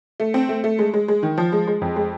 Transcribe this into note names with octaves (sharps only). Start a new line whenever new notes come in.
A3
C4
A3
A3
G#3
G#3
G#3
D#3
F3
G#3
G#3
F2
G#3